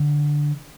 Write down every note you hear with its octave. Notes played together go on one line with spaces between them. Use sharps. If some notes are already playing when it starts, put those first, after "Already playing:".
Already playing: D3